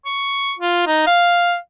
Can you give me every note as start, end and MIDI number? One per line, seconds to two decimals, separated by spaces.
0.06 0.53 85
0.59 0.85 65
0.87 1.06 63
1.07 1.56 77